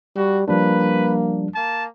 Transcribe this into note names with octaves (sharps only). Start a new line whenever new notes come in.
G3 F#4
F3 G3 A#3 D4 B4
A#3 A5